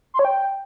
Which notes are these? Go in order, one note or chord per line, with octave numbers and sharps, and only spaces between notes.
C6
C#5
G5